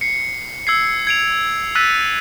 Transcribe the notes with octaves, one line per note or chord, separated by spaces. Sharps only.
C7 C#7
E6 G#6 C7
G#6 D7 F7
E6 F#6 A6 B6 D#7